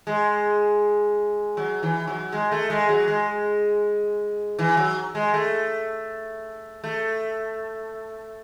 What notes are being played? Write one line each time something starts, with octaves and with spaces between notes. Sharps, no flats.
G#3
F#3
E3
F#3
G#3
A3
G#3
F#3
G#3
E3
F#3
G#3
A3
A3